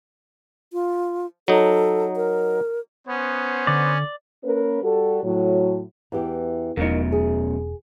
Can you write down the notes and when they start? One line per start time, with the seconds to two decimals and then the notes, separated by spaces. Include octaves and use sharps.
0.73 F4
1.48 F#3 D#4 A4
2.16 A#4
3.08 B3 C#4 C5
3.67 D3 D5
4.44 A#3 C#4 A#4 B4
4.83 G3 F#4 G4 A4
5.24 A2 F#3
6.12 E2 E3 G4
6.77 E1 F#2 B2 A#3 D#4
7.12 G#4